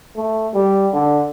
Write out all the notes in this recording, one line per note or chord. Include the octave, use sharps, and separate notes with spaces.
A3
G3
D3